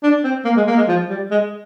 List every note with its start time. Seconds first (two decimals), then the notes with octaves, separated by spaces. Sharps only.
0.03 D4
0.24 C4
0.45 A#3
0.56 G#3
0.67 A#3
0.77 G#3
0.88 F3
1.09 G3
1.31 G#3